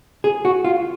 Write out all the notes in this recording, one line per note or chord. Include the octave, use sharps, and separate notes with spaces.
G#4
F#4
F4